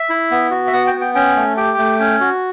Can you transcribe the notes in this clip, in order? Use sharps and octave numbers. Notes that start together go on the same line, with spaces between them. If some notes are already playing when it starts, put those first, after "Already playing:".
Already playing: E5
E4
B3
F#4
E5
B3 F#5
G5
B3
G5
C#4 G5
A3
G4 G5
A3
C#4
F#4